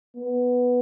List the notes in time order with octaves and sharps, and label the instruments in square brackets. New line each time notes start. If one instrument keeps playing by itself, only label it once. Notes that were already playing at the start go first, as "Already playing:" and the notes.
[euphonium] B3